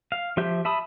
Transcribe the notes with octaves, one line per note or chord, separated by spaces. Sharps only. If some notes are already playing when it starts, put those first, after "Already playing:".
F5
F3 G4 E5 G6
E5 A5 B5 D#6